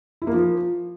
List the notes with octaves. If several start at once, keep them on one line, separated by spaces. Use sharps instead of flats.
E4
A#3
F3